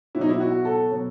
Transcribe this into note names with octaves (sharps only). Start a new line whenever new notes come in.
B2 F#3 D#4 E4
E4
F#4
A4
B2 F#3